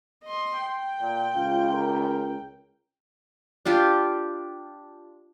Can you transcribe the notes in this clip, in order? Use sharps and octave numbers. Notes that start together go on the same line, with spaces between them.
D#5 C6
G5
A#2
C#2 F4
A#4
D4 F4 G4